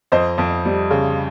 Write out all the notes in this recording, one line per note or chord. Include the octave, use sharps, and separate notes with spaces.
F2 C5 D#5
F2
G3
C#3